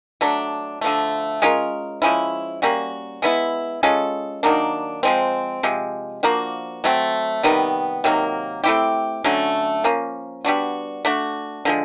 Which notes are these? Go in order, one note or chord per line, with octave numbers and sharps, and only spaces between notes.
F#3 A3 D4
D3 F3 A3
G#3 C#4 F4 A#4
F3 G#3 C#4 E4
G3 A#3 C#4 F#4
G#3 B3 E4
G#3 C#4 F4 A4
D#3 F#3 A#3 D4
F3 G#3 C4
C3 F3 G#3
F3 A#3 D4 F#4
F#3 A3 C4
C3 D#3 G3 B3
C3 D#3 F#3 A#3
A3 C4 E4 G4
D3 F#3 A3 C#4
F3 A#3 C#4
G3 B3 D4 F#4
A3 D4 F#4
D3 F3 G#3